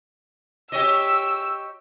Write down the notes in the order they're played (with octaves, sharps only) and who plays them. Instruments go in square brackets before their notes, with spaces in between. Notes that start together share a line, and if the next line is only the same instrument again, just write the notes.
[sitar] G4 C#5 D#5 [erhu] E6